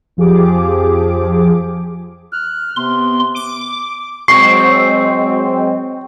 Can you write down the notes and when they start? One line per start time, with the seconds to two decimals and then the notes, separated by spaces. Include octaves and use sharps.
0.17 F2 F3 G4 G#4 D6
2.33 F6 F#6
2.76 C3 B3 C6
3.35 D6
4.28 F#3 G#3 C4 C#6 C7